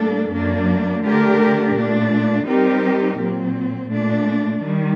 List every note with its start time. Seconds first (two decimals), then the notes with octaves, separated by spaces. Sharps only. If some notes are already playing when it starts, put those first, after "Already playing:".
Already playing: A2 G3 A#3 D4 A4
0.32 F#2 F#3 A#3 D4
1.04 D3 A3 D4 G4 A#4
1.75 A#2 A3 D4
2.46 G3 C4 D#4 G4 A#4
3.19 A#2 F#3 C4
3.90 A#2 A3 D4
4.63 D#3 G3